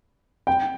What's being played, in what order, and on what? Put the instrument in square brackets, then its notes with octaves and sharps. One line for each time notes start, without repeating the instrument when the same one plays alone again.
[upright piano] G5